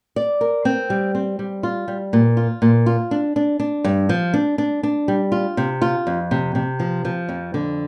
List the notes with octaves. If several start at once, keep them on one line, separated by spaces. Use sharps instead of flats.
D5
A#4
C4
G3
C4
G3
F4
G3
A#2
F4
A#2
F4
D4
D4
D4
G2
F3
D4
D4
D4
G3
F4
C3
F4
F2
C3
C3
F3
F3
F2
D3